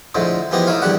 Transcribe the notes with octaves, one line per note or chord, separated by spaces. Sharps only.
A2 D3 F3 G#3 A3
E3 F3 B3 G4 G#4 D#5
A3 D#4 E4 C#5 F5
A#1 E2 E3 G3 D4 F#5